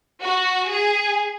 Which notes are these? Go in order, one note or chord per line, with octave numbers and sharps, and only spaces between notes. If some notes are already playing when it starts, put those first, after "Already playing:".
F#4
G#4